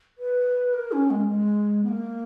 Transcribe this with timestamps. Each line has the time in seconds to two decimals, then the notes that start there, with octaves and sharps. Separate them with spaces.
0.18 B4
0.73 A#4
0.92 C#4
1.10 G#3
1.28 G#3
1.84 B3
1.88 A#3